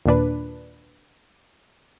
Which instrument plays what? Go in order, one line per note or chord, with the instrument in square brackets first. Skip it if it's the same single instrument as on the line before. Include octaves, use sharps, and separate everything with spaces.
[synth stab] D#2 A#2 D4 B4